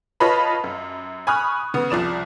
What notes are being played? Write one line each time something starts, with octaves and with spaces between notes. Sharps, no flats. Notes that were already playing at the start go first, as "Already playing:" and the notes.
F4 B4 C#5 D#5 A5 B5
F#2
G#5 B5 C#6 D#6 F6 F#6
C#3 B3 D#6
C2 F3 D5 E7